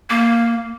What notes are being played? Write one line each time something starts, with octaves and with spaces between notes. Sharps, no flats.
A#3